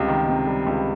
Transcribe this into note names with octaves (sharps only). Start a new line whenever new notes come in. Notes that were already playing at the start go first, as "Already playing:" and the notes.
Already playing: C#2 C3 G3
D#3
C3
G3
C#2